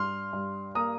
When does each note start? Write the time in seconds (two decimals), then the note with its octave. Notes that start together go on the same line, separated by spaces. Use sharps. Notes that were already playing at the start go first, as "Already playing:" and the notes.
Already playing: G2 C6 F6
0.33 G2
0.75 A#3 A#5 D#6